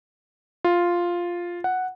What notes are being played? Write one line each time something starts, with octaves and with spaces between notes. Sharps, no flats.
F4
F#5